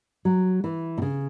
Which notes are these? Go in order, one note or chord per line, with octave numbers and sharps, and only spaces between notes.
F#3
E3
B2
C#3